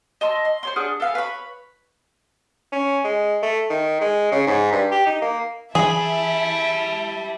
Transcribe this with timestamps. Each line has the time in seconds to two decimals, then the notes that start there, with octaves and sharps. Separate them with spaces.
0.21 D#5 A5 C6 E6
0.45 C6
0.63 C5 C#5 C6
0.76 D4 G#4 F#5 F6
1.00 A4 B4 F5 G#5
1.15 B4 C#5 B5
2.72 C#4
3.04 G#3
3.43 A3
3.70 D#3
4.01 G#3
4.32 C#3
4.47 G#2
4.73 G2
4.91 G4
5.06 D#4
5.22 A#3
5.75 E3 E4 G4 G#4 E5 A5 B5